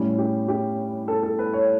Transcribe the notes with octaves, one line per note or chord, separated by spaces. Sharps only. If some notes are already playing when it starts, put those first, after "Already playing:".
Already playing: A2 G3 C#4
G4
G4
A4
A4
B4
C#5